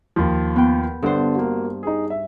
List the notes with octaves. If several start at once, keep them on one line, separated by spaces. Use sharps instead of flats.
D#2 F3
B3 G5
G2 D3 B3 D4 C5
A#3 F#4
D#4 G#4
E5